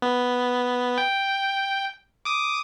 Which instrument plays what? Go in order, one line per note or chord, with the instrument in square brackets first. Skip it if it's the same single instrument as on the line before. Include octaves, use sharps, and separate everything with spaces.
[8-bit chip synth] B3
G5
D6 D#6